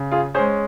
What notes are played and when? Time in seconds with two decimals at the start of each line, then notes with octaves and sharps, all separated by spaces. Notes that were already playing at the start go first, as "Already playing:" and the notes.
Already playing: C#3
0.12 F4 G#4
0.34 C#4 G#4 C5
0.38 G#3